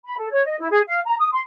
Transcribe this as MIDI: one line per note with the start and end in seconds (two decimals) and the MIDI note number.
0.06 0.15 83
0.17 0.28 69
0.31 0.46 73
0.46 0.56 75
0.59 0.67 64
0.71 0.81 68
0.88 1.00 77
1.06 1.15 82
1.20 1.29 87
1.32 1.40 84